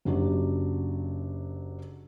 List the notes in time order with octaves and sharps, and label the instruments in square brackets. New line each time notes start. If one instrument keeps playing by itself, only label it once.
[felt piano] F#1 F#3 D4 G4